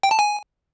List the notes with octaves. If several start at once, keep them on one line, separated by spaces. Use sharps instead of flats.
G5
A5
G#5